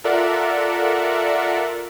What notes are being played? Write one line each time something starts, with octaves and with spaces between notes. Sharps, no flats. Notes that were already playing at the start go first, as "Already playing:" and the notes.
F4 A4 A#4 D5 E5 F#5